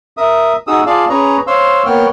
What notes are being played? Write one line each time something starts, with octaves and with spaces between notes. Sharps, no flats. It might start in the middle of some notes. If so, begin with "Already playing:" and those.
A#4 E5 D#6
D#4 F#4 G#4 D#6 E6
F4 G#4 D5 F5 A5
C#4 G#4 B4 C#5 A#5
C5 C#5 F5 C6 E6
A#3 B3 C#5 F#5 G5 F6